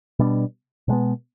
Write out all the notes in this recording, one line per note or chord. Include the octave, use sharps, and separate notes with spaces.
B2 G3 B3 D4
B2 G#3 B3